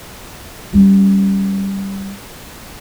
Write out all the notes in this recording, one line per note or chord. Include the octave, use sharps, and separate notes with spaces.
G3 C#4